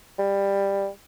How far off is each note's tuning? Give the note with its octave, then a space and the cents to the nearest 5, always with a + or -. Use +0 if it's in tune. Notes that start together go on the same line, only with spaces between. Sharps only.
G3 +15